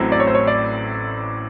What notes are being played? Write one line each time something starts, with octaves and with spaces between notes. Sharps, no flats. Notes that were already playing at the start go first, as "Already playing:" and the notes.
Already playing: A1 A2 F#3 A3 C4
D5
C#5
C5
C#5
D5